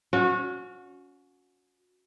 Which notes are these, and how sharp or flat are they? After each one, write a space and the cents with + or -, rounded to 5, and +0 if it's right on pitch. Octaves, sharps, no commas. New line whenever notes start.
C#4 +20 F#4 -25